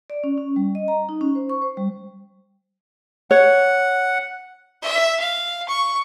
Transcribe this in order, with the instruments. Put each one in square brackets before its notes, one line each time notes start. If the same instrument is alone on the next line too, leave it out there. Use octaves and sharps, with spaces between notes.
[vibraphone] D5
C#4
C#4
G3
D#5
A#5
D#4
C#4
C5
C#6
C5
G3
[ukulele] C#5 [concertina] F#5
[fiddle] E5
F5
C#6